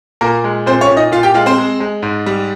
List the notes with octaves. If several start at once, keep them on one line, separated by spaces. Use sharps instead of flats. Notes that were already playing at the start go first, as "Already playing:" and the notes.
A#2 A#3 A#4
G#3
A#2 C4 C5
C#4 C#5
A#2
D#4 D#5
A#2 F4 F5
G4 G5
G#3 F4 F5
C4 C5
G#3
G#3
G#2
G3